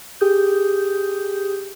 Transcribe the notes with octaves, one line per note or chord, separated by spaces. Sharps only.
G4 G#4 D#6 G6